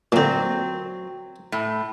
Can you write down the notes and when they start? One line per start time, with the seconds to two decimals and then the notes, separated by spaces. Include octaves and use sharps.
0.12 A#2 D3 F#3 C4
1.52 A2